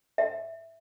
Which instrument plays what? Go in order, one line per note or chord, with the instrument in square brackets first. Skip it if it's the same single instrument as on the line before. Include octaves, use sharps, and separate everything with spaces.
[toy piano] E5